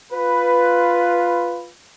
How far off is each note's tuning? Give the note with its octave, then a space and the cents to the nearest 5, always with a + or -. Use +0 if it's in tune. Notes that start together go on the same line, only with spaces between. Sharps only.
F4 +0 B4 +5